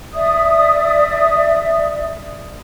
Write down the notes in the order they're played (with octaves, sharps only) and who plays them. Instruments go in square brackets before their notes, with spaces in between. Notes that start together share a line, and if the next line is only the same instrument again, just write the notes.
[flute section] D5 E5 D#6